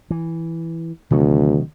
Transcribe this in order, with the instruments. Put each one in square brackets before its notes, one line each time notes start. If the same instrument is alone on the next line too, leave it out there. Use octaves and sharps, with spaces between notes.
[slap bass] E3
[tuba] D2 [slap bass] C3 D#3 F#3